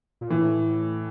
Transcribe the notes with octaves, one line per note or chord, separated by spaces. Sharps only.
A#2
A2 E3